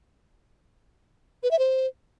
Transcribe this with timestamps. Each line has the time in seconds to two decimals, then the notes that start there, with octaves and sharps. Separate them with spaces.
1.43 B4
1.51 E5
1.59 C5